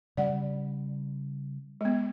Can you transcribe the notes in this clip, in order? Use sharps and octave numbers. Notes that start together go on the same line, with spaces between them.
C#3 G3 D5 F#5
G#3 B3